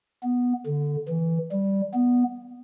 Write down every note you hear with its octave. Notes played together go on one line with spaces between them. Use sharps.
B3
D3
E3
G3
B3